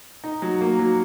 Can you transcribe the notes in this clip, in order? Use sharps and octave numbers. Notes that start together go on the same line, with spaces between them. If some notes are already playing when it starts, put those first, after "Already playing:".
D#4
F#3
A#3
F#3